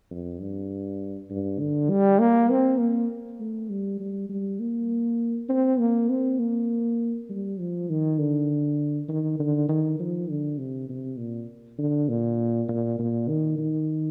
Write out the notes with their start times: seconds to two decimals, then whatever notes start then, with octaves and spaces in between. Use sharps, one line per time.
0.11 F2
0.40 G2
1.30 G2
1.60 D3
1.90 G3
2.20 A#3
2.50 C4
2.79 A#3
3.40 A3
3.70 G3
4.00 G3
4.30 G3
4.60 A#3
5.49 C4
5.79 A#3
6.10 C4
6.39 A#3
7.30 G3
7.59 F3
7.90 D#3
8.19 D3
9.09 D#3
9.40 D3
9.69 D#3
10.00 F3
10.29 D3
10.58 C3
10.89 C3
11.18 A#2
11.79 D3
12.09 A#2
12.69 A#2
12.99 A#2
13.29 D#3
13.58 D#3